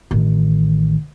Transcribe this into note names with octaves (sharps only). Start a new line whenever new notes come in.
A1 D#3